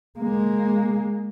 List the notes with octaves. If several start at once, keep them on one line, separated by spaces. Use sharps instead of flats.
G#3 A#3